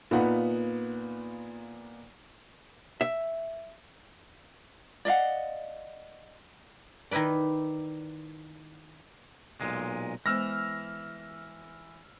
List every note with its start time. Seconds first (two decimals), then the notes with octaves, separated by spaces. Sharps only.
0.11 A#2 B3 D#4 F4 F#5 B5
3.01 E5
5.05 D5 D#5 F5 F#5
7.11 D#3 D#4 E4 B4 D5
9.61 B1 A#2 G#3
10.26 E3 G#3 B3 C5 E6 F6 A#6